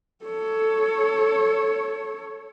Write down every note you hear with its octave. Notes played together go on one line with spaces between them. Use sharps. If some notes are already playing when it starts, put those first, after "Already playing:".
A4 C#5